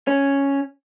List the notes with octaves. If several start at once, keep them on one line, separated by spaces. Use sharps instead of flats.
C#4